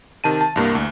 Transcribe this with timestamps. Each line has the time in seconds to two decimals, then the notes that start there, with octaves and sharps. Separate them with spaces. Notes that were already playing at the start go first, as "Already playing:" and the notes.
0.24 C3 D#3 A5 D#7
0.41 A5
0.56 C2 G2 A#3
0.75 D2